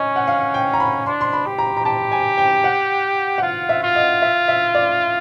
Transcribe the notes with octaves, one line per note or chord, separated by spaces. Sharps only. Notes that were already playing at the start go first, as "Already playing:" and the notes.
Already playing: C#4 D#5
F#5
F5
G5
A#5
B5
D4 C6
C6
B5
G4
A#5
A#5
G4 A5
G#5
G5
F#5
F#5
F4 F5
E5
F4
D#5
E5
E5
D5